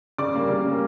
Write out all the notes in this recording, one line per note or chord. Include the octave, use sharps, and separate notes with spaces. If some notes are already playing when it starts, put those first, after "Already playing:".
C#3 D5 D6
G3 A#3
C#3
G3 A#3